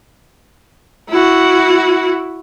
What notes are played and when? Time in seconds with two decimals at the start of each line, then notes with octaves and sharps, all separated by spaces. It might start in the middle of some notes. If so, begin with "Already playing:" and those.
1.10 E4 F#4